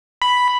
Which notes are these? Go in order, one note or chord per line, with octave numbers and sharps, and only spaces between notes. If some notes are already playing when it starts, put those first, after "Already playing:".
B5